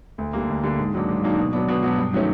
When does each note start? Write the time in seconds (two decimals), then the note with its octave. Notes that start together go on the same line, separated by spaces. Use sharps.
0.18 D2
0.33 D3 G3 A#3
0.49 D2
0.63 D3 G3 A#3
0.78 G#2
0.94 D#3 F#3 A#3 D4
1.09 G#2
1.23 D#3 F#3 A#3 D4
1.38 B2
1.53 F#3 B3 D4
1.68 B2
1.83 F#3 B3 D4
1.98 G2
2.13 D#3 F#3 A3 C#4